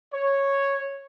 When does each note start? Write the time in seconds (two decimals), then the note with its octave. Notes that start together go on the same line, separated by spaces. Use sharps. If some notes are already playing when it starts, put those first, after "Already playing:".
0.13 C#5